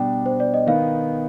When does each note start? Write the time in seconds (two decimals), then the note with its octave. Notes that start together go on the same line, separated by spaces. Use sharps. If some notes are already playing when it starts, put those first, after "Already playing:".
Already playing: B2 G3 D4 G5
0.26 C5
0.40 D5
0.54 D#5
0.67 D#3 B3 D#4 F5